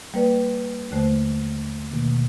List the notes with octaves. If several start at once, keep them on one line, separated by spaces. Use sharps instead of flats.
G3 A#3 B4 D5
D#2 D3 A3 C5
B2 D#3 A#3